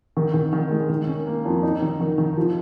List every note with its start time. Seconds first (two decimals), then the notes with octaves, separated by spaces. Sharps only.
0.17 D#3
0.34 D#3
0.53 D#3
0.71 G#3
0.89 D#3
1.07 C#4
1.27 A#3
1.45 F2
1.63 D#4
1.82 D#3
2.00 D#3
2.18 D#3
2.37 F3